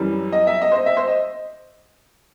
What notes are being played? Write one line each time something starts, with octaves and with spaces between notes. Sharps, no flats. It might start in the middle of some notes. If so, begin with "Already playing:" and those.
Already playing: F#2 E3 G3
D#5
E5
D#5
C5
D#5
E5
C5
D#5